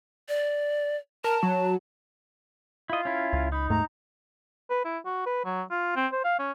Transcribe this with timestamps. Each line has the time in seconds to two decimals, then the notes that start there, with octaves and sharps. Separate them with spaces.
0.29 D5
1.24 A#4 A5
1.43 F#3
2.90 E4 F4 D#5
3.05 C#4 E4
3.33 C#2
3.52 D#4 B5
3.70 D#2 G#2 A3 A#5
4.70 B4
4.85 E4
5.05 F#4
5.26 B4
5.45 F#3
5.70 F4
5.96 C4
6.12 C5
6.24 F5
6.39 C#4